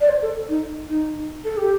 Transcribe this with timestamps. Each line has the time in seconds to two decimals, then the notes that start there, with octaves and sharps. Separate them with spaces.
0.01 D5
0.09 C5
0.22 A4
0.49 D#4
0.89 D#4
1.44 A4
1.57 G4